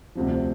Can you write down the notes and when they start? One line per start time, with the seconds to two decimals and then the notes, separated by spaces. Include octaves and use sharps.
0.15 D2 C3 F3